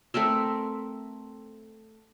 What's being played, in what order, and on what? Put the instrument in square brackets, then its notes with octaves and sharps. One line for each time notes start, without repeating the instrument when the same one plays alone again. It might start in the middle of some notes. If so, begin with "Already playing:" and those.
[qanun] A3 C4 A#4 E5